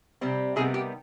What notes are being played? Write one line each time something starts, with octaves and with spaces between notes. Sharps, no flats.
C3 G3 C4
C3 D#3 G3 B3 G#4
G4